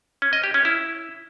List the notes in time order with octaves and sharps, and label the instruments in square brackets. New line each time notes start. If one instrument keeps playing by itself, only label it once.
[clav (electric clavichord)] C#4
D#5
G4
C#4
E4